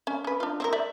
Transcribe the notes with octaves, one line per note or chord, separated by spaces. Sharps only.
C#4
C#4 B4
D4 F4
C4 E4 A#4
D5 E5